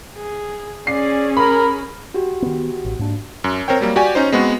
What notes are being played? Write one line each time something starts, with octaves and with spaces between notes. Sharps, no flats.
G#4
C#4 G#4 D5 C7
A#4 B5
F#4 G4
D#3 B3
A1
G#2 A#3 D4
F#2
C4 A#4 C5 C#5 G5
F#3 G3 A#3
F#4 G4 D5 G5 G#5
C#4 D#4 C5
G#3 B3 C4 F#4